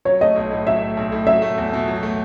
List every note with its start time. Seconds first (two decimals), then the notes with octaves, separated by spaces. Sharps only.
0.05 F#3 C#5
0.21 A3 D#5
0.36 B1
0.51 A2
0.67 F#3 E5
0.82 A3
0.97 B1
1.12 A2
1.27 F#3 E5
1.42 A3
1.58 E2
1.73 B2
1.88 F#3
2.03 A3